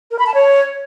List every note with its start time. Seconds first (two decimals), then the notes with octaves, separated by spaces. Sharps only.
0.11 A#4
0.19 B5
0.27 A5
0.34 C#5